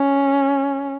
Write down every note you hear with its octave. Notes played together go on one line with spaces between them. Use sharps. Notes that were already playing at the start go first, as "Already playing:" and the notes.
Already playing: C#4